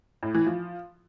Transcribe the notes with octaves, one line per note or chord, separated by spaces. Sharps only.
A2
E3
F3